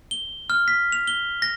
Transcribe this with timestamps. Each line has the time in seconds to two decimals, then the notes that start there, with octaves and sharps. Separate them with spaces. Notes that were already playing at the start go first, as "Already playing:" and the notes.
0.11 G7
0.50 F6
0.68 B6
0.92 F7
1.08 G7
1.42 A#6